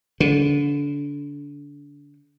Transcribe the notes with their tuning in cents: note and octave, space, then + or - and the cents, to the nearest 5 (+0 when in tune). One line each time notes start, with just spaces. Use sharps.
D3 -30